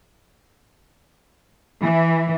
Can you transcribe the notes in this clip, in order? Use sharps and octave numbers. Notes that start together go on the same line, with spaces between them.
E3